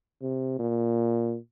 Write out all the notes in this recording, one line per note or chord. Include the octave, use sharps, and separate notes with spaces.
C3
A#2